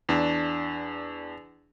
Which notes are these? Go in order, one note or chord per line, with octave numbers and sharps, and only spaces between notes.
E2 D4